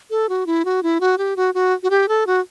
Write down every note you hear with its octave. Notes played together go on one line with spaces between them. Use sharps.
A4
F#4
E4
F#4
E4
F#4
G4
F#4
F#4
F#4
G4
A4
F#4